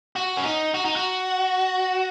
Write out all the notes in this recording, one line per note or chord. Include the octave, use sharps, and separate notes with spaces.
F#4
C#4
D#4
F#4
D#4
F#4